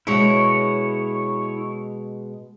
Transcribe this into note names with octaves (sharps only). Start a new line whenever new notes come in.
B2 G#3 E4 C#5